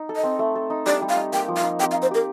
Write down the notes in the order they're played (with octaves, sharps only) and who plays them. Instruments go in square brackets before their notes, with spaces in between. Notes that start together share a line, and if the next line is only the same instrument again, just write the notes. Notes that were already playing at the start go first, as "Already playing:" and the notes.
Already playing: [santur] D#4
A4
[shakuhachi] D#5
[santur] C4
A3
A4
D#4
[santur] G3 [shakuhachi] D5
[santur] G3
[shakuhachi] F5
[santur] D#4
[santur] A#3 [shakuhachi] G5
[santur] F3
[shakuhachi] F5
[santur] D#4
[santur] C4 [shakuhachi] G5
[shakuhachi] F5
[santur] D#4
[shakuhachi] C5
[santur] G4 [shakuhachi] A#4